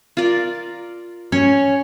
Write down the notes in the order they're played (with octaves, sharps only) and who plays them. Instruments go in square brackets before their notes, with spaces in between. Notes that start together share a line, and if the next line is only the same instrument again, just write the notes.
[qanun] F4 A#4 D5
[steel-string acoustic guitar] C#4 [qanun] C#5